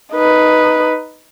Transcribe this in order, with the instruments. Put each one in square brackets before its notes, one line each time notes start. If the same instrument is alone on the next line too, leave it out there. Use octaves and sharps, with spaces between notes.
[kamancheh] D#4 B4